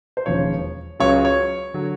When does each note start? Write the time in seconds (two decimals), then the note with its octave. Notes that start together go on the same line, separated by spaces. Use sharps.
0.17 C5
0.26 E1 D#2 C#3 F3 C#5
1.00 C#2 C#3 F#3 C#5
1.25 C#5
1.74 D3 F#3